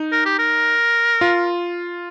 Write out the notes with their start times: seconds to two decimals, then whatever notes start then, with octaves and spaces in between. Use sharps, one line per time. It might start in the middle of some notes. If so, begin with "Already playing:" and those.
Already playing: D#4
0.12 A#4
0.25 G4
0.39 A#4
1.21 F4